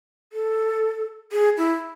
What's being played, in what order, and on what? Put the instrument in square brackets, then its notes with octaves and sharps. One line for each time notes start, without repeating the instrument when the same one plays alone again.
[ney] A4
G#4
E4